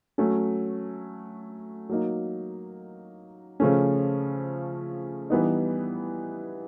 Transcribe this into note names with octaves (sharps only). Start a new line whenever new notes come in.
F#3 A3 C#4
F#3 A#3 D#4
C#3 F3 A3 C#4
E3 G3 B3 D#4